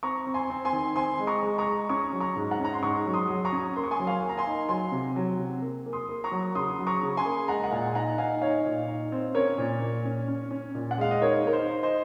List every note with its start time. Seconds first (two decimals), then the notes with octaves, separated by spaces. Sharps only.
0.03 C4 A#5 C#6
0.27 C4
0.34 G#5 C6
0.50 C4
0.65 G#5 C6
0.73 D#3
0.96 C4 G#5 C6
1.19 G#3
1.27 A#5 C#6
1.43 G#3
1.58 A#5 C#6
1.67 G#3
1.89 C#4 A#5 C#6
2.12 F#3
2.20 A#5 C#6
2.36 G#2
2.51 F#5 A#5
2.59 C#4
2.65 A#5
2.74 C6
2.83 G#2 A#5 C#6
3.06 F#3
3.13 C6 D#6
3.29 F#3
3.45 A#5 C#6
3.52 C#4
3.76 A#3 C6
3.84 C#6
3.91 G#5 C6
4.00 F#3
4.07 F5 G#5
4.23 A#3
4.29 A#5
4.37 G#5 C6
4.46 D#4
4.69 F#3 G#5 C6
4.92 C3
5.16 F#3
5.39 C3
5.62 A#3
5.86 A#3
5.93 C6 D#6
6.09 A#3
6.24 A#5 C#6
6.31 F#3
6.55 C#3 C6 D#6
6.78 F#3
6.87 A#5 C#6
7.02 C#3
7.17 G#5 C6
7.25 A#3
7.48 G#3 F#5 A#5
7.64 F#5
7.71 A#2 F5 G#5
7.95 D#4 F#5 A#5
8.18 D#4 F5 G#5
8.41 D#4 C#5 F5
8.65 A#2
8.88 D#4
9.12 C4
9.34 C#4 A#4 C#5
9.58 A#2
9.81 A#2
10.05 C#4
10.28 C#4
10.51 C#4
10.75 A#2
10.91 F#5
10.98 G#3 F5
11.11 D#5
11.21 D#4 A#4 C#5
11.45 D#4 A#4
11.53 C5
11.67 D#4
11.83 C5 D#5